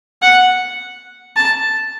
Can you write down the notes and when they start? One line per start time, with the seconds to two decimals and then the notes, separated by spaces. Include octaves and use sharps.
0.22 F#5
1.36 A5